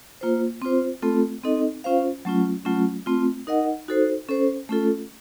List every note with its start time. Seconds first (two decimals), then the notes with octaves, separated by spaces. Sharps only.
0.21 A#3 F4 C5
0.62 C4 F4 C5
1.02 A3 C4 F4 A4
1.44 C4 D#4 A4 D#5
1.84 C#4 F4 C5 F5
2.25 F#3 A3 C#4 F4
2.65 F#3 A3 C#4 F4
3.06 A3 C4 F4
3.47 D#4 A#4 D#5 F#5
3.88 D#4 F#4 A4 C5
4.29 C#4 A4 C5
4.69 A3 C#4 F4 A4